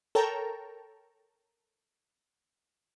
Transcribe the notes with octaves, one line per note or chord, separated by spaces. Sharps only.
A4 A#4 C#5 G5 A5 A#5